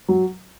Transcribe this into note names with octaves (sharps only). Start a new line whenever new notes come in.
F#3